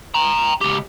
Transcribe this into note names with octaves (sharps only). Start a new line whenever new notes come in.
G5 A#5
C#2 G4